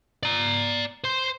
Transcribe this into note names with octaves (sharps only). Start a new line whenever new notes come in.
D5 A#5
C5 C6